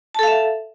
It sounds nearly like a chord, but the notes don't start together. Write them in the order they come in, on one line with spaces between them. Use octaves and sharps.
A5 A4 F5 E5